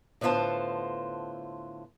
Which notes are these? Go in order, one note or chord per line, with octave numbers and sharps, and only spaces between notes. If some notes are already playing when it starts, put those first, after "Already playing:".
A2 D3 B3 F4 C5 A5